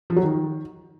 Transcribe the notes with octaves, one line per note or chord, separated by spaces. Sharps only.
F3
F#3
D#3